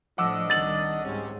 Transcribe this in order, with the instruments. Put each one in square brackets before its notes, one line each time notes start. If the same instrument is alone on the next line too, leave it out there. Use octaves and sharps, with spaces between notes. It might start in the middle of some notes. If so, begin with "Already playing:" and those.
[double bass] A2 F3 [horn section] D4 D#5 [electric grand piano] F#5 D6 E6
[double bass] C2 D#3 [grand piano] A6 F#7
[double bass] G#2 [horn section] C3 C4 C#4